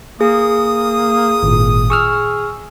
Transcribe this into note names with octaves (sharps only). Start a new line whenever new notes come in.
A#3 G#4 D#6
G#1 A#2
G#4 C#6 E6 F6